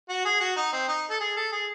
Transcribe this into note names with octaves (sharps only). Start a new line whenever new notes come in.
F#4
G#4
F#4
D#4
C4
D#4
A4
G#4
A4
G#4